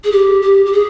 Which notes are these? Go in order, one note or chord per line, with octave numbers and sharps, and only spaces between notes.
G#4
G4
G4
G4
G#4